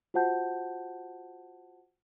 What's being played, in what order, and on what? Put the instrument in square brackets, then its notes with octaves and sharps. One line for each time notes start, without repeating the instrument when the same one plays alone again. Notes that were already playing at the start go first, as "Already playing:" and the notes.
[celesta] F4 F#4 C5 F#5 A5 G6